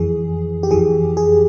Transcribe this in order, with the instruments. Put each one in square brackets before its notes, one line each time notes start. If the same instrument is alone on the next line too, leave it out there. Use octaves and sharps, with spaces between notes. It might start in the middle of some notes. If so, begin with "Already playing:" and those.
Already playing: [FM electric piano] F2 E3 G#4
G4
F2 E3 G#4
G#4